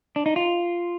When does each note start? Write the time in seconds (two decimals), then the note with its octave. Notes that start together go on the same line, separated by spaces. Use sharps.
0.16 D4
0.26 D#4
0.36 F4